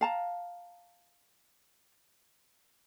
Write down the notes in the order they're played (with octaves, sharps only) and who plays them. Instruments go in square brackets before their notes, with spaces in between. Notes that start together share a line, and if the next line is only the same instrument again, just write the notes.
[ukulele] F5 A5 A#5